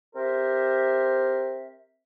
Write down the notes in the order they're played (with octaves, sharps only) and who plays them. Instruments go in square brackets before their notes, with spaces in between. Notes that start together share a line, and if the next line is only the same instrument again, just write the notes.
[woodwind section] C4 G4 A#4 C5 E5